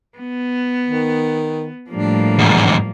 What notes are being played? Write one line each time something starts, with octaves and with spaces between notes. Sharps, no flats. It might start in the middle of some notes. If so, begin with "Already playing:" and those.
B3
D#3
A2 F3 G3 A#3 D4
E2 G#2